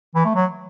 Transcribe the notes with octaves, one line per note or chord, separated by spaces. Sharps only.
E3
A3
F#3